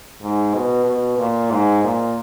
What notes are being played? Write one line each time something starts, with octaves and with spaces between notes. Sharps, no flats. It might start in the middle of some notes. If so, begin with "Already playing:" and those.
G#2
B2
B2
A#2
G#2
A#2